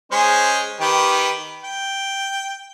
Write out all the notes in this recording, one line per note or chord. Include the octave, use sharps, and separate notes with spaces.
G#3 C#4 C5
D#3 G4 B4
G5